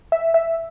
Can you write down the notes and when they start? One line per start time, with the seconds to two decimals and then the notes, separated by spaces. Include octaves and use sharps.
0.12 E5
0.34 E5